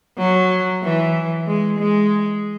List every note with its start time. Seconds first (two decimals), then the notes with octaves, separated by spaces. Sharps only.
0.18 F#3
0.83 E3
1.47 G#3
1.79 G#3